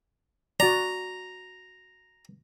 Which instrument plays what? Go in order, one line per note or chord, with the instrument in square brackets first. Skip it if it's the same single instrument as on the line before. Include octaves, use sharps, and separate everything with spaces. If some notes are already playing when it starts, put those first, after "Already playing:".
[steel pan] F#4 D5 [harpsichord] A#5